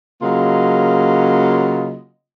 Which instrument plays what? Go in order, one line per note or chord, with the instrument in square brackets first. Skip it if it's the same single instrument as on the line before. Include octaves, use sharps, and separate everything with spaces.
[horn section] C#3 F#3 A#3 F4 D#5 C6